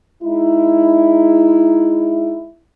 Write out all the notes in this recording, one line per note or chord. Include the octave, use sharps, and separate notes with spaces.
G#3 D#4 E4